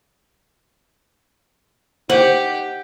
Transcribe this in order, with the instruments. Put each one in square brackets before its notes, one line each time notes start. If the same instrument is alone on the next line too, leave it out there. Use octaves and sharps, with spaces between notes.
[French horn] D#4 [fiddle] G4 [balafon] C5 [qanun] F#5